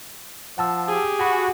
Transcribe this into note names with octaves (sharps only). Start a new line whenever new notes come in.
F3 F#5 A5 E6
G4 G#4
F#4 G#5 B5 C#6